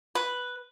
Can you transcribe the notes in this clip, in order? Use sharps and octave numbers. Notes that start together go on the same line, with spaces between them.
B4